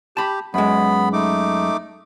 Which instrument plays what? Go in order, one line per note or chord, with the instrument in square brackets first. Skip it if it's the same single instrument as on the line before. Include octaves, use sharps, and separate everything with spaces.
[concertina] G4 [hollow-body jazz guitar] A5 B5
[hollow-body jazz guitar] F#2 G#3 [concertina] B3 B5
[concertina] A3 D#4 D6